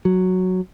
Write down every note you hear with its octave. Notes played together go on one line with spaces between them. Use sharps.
F#3